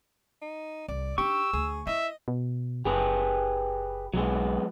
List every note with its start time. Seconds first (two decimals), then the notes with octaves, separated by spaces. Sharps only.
0.42 D#4
0.88 C2 D5
1.18 D4 D#4 G4 C#6 E6
1.53 D2 G#4
1.87 E4 D#5 E5
2.28 B2
2.85 F#1 G4 G#4 B4
4.14 B1 F#3 G#3 B3